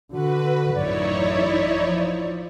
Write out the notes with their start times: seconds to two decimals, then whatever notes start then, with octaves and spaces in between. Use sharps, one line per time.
0.12 D3 F#4 B4
0.74 A1 F#2 D#4 E4 C#5 D5
1.82 F3